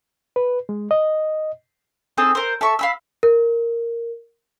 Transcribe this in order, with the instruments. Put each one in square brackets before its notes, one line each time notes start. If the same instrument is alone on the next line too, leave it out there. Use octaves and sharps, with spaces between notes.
[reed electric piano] B4
G#3
D#5
[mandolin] C4 D#4 G#4 A4
A#4 C5
A4 E5 C#6
F5 B5 E6
[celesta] A#4